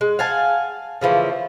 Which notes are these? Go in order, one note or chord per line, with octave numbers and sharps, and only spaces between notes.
G#3
F5 F#5 G#5 A5
C#3 E3 F3 A3